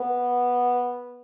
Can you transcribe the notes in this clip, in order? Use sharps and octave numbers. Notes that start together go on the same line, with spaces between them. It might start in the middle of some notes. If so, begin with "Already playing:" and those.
Already playing: B3